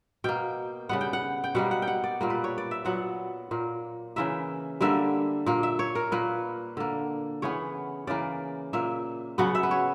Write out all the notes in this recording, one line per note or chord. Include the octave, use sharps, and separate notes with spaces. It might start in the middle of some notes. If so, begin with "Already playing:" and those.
B2 A#3 G5
C#3 G3 B3 F#5
G5
F#5
G5
B2 G3 A#3 F#5
F#5
G5
F#5
D5
A#2 G3 A#3
B4
C#5
D5
E5
A#2 F#3 B3 F#5
A#2 A#3
C#3 E3 A#3 E5
D3 G3 A#3 E5
A#2 A#3
E5
C#5
A#4
A#2 A#3 B4
D3 A#3
C#3 E3 B3 C#5
C#3 E3 A#3 D5
A#2 A#3 E5
C#3 F#3 B3 F#5
E5
B4
C#5